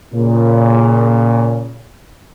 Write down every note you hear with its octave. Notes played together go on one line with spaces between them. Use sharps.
A#2 C#3